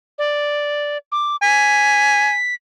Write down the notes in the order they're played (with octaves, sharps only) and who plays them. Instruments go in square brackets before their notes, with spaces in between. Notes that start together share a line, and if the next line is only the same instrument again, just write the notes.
[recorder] D5
D6
[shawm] G#5 [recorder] B6